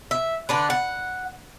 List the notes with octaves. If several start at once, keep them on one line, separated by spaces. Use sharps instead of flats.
E5
D3 D4 B4
F#5